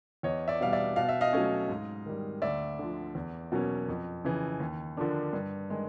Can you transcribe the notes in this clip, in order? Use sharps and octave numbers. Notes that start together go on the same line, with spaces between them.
E2 C#5 D#5
D5 E5
B2 G3 F5
D5 E5
B2 F5
E5
D#5 F5
F#3 A3 C#4
G#2
D#3 G3
D2 D5 E5
D3 F3
E2
B2 F#3 A#3 C#4
F2
C#3 E3
D#2
D3 F3 A#3 D4
G2
D#3 G#3